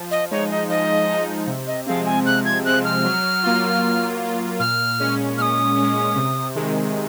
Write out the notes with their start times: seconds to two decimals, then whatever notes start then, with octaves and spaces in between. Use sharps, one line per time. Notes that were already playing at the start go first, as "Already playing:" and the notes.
Already playing: F3
0.11 D#5
0.31 G#3 D#4 C#5
0.50 D#5
0.69 F3 D#5
1.09 G#3 D#4
1.47 C3
1.67 D#5
1.86 F3 G#3 C4 F5
2.06 G#5
2.26 C3 F#6
2.45 G#6
2.65 F3 G#3 C4 F#6
2.85 F6
3.04 F#3
3.43 A#3 F4
3.82 F#3
4.21 A#3 F4
4.60 A#2 F6
5.00 G#3 C#4
5.38 A#2 D#6 F6
5.77 G#3 C#4
6.16 C3
6.55 D#3 G#3